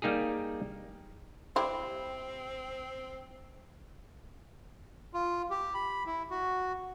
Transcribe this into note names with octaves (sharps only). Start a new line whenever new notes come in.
G3 A#3 D#4 G4 G#4
G3 C4 E4 C5
F4
G4
B5
E4
F#4